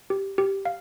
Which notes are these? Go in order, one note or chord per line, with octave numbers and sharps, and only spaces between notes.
G4
G4
F5